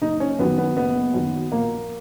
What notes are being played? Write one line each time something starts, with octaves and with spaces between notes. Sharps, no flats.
F#1 D#4
C#4
F#2 D#3 F#3 B3
B3
F#1 B3
F#2 D#3 F#3
A#1 A#3